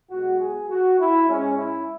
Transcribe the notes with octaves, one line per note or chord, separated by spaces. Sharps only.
B1 B2 G#3 F#4
G#4
F#4
E4
G#2 G#3 C#4
E4